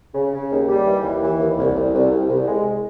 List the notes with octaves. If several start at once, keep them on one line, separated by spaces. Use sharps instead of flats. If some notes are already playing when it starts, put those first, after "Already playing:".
C#3
C#3
D#2
G3
E3
D#2
E3
D#2
C2
C2
C2
C2
C2
G#3